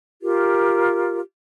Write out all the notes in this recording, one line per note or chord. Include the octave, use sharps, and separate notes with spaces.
F4 G4 A#4